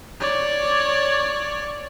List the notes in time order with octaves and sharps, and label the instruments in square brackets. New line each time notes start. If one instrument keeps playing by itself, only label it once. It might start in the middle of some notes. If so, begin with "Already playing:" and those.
[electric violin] C#5 D5